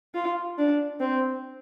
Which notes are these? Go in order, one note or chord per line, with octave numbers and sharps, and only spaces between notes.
F4
D4
C4